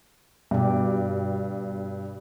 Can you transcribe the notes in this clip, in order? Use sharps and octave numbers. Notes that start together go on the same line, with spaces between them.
G2 B2 G4